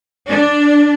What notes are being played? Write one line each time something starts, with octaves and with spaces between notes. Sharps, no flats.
D4